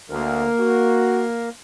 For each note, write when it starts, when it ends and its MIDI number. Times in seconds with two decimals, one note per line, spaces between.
0.10 0.48 38
0.10 1.49 58
0.10 1.49 70
0.59 1.24 66